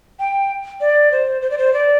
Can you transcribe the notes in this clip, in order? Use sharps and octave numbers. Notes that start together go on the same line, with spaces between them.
G5
D5
C5
C5
D5
C5
D5